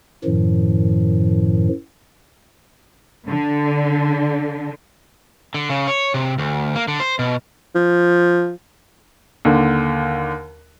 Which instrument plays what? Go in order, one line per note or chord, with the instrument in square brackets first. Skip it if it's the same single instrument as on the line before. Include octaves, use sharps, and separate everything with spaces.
[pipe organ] F#2 A2 D#3 F3
[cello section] D3
[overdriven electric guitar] D3
C#3
C#5
C3
D2
A#3
D3
C5
B2
[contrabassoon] F3
[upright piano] D#2 D3